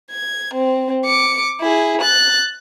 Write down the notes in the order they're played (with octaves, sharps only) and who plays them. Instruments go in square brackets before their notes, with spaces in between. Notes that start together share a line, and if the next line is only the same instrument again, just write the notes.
[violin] G#6
C4
D6 C#7
E4 G#4
F#6 A6